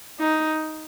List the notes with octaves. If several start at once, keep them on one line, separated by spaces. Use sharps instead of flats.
D#4